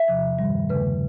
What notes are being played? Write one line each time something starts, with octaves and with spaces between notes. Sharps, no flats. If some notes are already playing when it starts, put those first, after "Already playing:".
Already playing: E5
E2 C3 F3
G2 D#3 G3
E2 C#3 F3 A3 B4